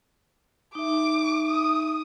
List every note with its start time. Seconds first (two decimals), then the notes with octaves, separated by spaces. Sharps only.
0.75 D#4 E5 D6
1.47 D#6